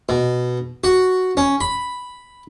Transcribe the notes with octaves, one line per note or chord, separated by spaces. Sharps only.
B2
F#4
C#4
B5